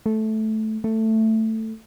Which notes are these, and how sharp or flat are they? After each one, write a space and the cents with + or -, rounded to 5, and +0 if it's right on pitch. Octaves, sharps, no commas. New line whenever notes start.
A3 -10
A3 +10